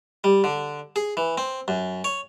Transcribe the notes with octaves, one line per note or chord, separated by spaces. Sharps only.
G3
D3
G#4
E3
C4
F#2
C#5